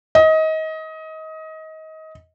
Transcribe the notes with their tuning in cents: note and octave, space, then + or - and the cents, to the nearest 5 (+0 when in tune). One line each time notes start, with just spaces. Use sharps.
D#5 +25